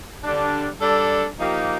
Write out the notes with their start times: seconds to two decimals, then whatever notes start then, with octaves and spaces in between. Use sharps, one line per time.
0.23 D3 G3 D4
0.81 G3 D4 A4
1.38 F3 A#3 D#4 G4